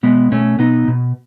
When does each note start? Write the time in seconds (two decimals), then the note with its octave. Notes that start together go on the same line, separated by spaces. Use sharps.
0.03 B2 G#3 B3
0.32 B2 A3 C#4
0.59 B2 B3 D#4
0.88 B2